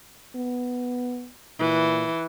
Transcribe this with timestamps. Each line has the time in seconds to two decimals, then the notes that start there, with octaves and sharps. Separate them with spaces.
0.35 B3
1.59 A#2 E3